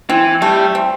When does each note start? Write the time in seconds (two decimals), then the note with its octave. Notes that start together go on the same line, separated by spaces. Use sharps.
0.09 E3 C4
0.42 G3 A3
0.75 C4